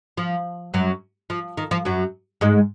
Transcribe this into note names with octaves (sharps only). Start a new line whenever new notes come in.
F3
F#2 F#3
F3
D#3
F3
F#2 F#3
G#2 G#3